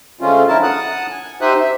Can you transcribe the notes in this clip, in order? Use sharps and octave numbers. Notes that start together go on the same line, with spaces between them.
D3 G#3 A3 C4 C#4 F4
F2 D3 E4 A#4 A5
F#5 A5 D#6 F#6
G#5
D#4 G4 C5 E5 D#6 F#6
E5